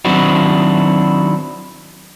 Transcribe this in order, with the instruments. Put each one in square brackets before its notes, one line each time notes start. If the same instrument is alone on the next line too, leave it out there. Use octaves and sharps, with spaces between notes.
[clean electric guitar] D#3 F#3 C4 D4 E4 F#4